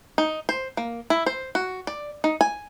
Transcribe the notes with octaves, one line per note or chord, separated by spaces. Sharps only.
D#4
C5
A#3
E4
C5
F#4
D5
D#4
G#5